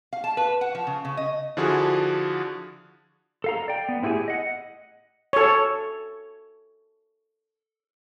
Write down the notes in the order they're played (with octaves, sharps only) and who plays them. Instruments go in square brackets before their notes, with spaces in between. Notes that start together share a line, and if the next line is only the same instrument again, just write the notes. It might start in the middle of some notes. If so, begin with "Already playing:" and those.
[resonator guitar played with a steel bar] F5
A5
B4
F#5
F3
C#3
C#3
D#5
[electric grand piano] D3 F3 D4 E4 F#4 G#4
[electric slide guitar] A4 F5 A#5
D5 G5
B3
A2 B3 E4 G4 G#4 G#5
D#5 F#5
[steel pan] A4 C#5